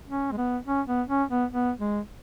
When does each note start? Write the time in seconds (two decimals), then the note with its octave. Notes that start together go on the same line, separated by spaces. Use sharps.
0.09 C#4
0.32 G#3
0.38 B3
0.66 C#4
0.87 B3
1.09 C#4
1.30 B3
1.51 B3
1.80 G#3